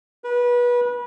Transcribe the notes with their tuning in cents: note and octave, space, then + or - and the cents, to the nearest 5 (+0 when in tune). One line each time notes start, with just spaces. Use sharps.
B4 -25